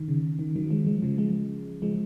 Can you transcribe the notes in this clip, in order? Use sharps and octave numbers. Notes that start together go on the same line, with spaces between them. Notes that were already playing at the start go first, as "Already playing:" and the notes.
Already playing: D#3
C#3
D#3
D#3 F#3
F3 G#3
F3 G#3
C#3 F3
F3 G#3
F3 G#3